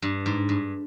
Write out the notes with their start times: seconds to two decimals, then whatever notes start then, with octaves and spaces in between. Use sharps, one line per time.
0.02 G2
0.26 G#2
0.49 G2